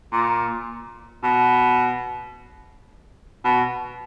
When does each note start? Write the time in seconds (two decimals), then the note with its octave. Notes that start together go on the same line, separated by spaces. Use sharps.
0.12 A#2
1.23 B2
3.44 B2